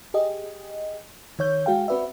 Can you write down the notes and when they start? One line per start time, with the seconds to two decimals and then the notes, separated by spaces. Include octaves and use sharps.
0.14 G4 G#4 D#5
1.39 D#3 C#5 G6
1.66 G#3 F#4 G#4 F5 G5
1.88 C4 F#4 B4 D5 E5